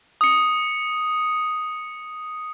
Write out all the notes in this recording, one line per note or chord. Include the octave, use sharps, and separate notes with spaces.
D#6 C#7